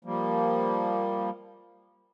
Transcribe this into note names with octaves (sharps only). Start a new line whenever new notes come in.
F3 G3 A#3